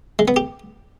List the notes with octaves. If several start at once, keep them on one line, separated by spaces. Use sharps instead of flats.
G#3
B3
G4